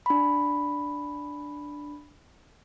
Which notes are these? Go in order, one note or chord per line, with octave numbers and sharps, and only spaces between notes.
D4 B5